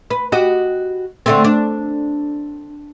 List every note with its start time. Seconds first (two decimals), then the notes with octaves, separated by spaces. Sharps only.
0.10 B4
0.32 F#4 G4 D#5
1.26 D3 A3 C4
1.44 D4